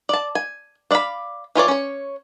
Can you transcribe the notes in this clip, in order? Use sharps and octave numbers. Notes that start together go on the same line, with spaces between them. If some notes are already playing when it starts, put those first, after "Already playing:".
D5 A5
G#5
D4 D5 D#5 F5 B5
E3 F4 C#5 D5
C#4 C#5